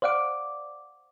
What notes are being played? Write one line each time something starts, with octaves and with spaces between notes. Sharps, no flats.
C5 D5 F5 F#5 D6